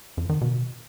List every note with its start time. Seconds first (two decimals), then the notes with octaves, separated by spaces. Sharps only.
0.17 F2
0.29 D#3
0.41 B2